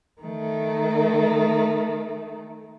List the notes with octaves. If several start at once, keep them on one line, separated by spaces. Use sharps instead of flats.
D#3 A3